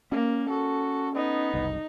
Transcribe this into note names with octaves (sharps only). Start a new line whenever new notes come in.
A#3 C#4
F#4 A4
B3 D#4
F#1 C2